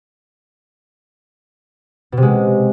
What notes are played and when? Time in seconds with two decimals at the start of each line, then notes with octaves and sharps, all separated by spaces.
2.12 B2
2.17 C3
2.22 G#3